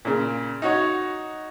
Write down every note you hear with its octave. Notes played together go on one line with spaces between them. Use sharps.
A#2 C#3
D#4 F#4 C#5